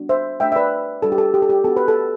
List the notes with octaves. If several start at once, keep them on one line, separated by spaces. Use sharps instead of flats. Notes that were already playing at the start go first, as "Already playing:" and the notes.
Already playing: G3 B3 D4 F#4
C5 E5
A3 D4 F#4 E5 G5
E5
B4 D5
G3 D4 F#4 A4
G4
A4
G4
A4
G4
B3 F#4 A4
B4
A4